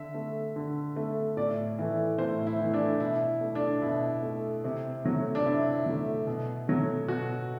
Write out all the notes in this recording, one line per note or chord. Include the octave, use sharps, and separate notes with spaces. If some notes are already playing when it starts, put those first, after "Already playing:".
Already playing: D3 E5
A3
D3
A3
A2 D5
E3 A3
A2 C5
E4
E3 A3
D4
B2 E4
A3
D4
B2 E4
A3
C3
F#3 A3
D4
C3 E4
F#3 A3
B2
F#3 A3
B2 F#4